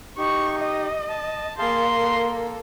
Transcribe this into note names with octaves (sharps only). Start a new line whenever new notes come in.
D#4 G4 C#6
D#5
A5
A#3 G#4 F5 A5 C6
A4